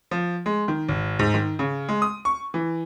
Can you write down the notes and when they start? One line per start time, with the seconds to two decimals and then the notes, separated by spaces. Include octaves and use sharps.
0.11 F3
0.46 G#3
0.68 D#3
0.89 G#1
1.19 G#2
1.34 D#3
1.59 C#3
1.89 G#3
2.02 D#6
2.25 C#6
2.54 E3